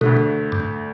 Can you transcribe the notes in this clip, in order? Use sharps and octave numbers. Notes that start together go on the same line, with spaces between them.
D2 B2 D3 A3
G2